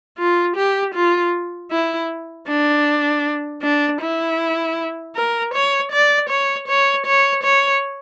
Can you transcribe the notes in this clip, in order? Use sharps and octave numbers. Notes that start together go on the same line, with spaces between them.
F4
G4
F4
E4
D4
D4
E4
A#4
C#5
D5
C#5
C#5
C#5
C#5